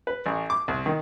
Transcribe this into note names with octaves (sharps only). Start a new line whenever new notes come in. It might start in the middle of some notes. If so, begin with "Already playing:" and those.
B4
A1
D6
C2
D#3